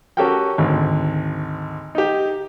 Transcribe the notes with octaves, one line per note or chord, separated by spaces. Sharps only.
C#4 F#4 G4 A4 A#4 G5
G#1 D2
D#4 G4